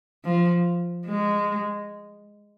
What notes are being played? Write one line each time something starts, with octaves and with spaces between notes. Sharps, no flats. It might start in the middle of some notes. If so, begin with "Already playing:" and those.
F3
G#3